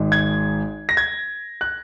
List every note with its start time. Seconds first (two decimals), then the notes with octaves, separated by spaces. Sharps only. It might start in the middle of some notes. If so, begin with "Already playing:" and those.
Already playing: G#1 G#2 G#3
0.12 G#6
0.89 A#6
0.97 G#6
1.61 F#6